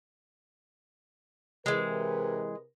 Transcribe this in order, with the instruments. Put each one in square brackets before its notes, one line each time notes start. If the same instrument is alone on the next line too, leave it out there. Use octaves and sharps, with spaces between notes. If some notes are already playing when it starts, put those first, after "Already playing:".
[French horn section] C3 A#4 B4 [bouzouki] E3 G#3